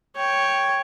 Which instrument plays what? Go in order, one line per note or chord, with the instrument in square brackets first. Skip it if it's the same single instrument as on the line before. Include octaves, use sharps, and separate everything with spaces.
[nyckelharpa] C#5 G5